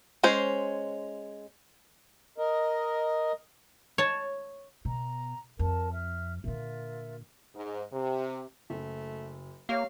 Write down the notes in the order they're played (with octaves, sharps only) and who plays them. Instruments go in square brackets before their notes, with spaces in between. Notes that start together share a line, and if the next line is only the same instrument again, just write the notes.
[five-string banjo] G#3 C#4 C5
[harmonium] A#4 D#5
[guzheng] C#5 A5
[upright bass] B2 [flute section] A#5
[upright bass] F2 [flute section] A#4 A5
[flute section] E5 F6
[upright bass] A#2 D3 [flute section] F4 A#4 E5
[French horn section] G#2
C3
[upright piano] F#1 [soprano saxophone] A3
[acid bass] A#3 [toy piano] G4 C#5 E5 [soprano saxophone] F5